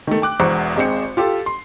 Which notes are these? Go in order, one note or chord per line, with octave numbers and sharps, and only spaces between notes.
D#3 A3
G5 D6 F#6
E1 E2 C5 A#5 C#6
G#1 G#3 C4 C5 C#7
F4 G4 A4
C6